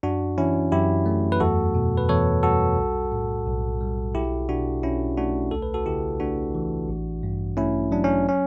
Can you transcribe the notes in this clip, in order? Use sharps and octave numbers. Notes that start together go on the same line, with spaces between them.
F#2 D4 F#4
E3 C#4 E4
F#2 E4 G4
A3
B4
E2 F#4 A4
B2
B4
E2 A4 C#5
G3 F#4 A4
B1
A2
B1
G3
B1 E4 G4
B2 D4 F#4
B1 C#4 E4
A3 D4 F#4
D2 A4
B4
F#4 A4
C#3 E4 G4
A3 D4 F#4
E3
A1
G2
A3 C#4 E4
F#3 D4
C#4
C#4